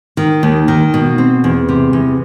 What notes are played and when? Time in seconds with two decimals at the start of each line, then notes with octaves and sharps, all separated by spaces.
0.17 D#3
0.43 D#2
0.68 D#3
0.94 B2
1.18 C4
1.44 E2
1.69 C3
1.93 E2